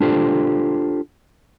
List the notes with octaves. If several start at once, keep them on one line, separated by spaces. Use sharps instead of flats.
D4 F4 G4 A4 C5